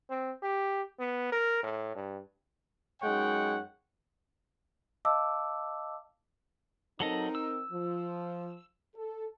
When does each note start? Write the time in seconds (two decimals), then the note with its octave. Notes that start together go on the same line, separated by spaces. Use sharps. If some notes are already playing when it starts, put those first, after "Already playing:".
0.10 C4
0.42 G4
1.00 B3
1.32 A#4
1.63 A2
1.95 G2
3.02 F#2 G#3 D#4 C#5 F#5 G5
5.05 D#5 F5 A5 D6 E6
7.00 F#3 C4 D#4 A4 A#4 D#5
7.35 E6
7.72 F3
8.95 A4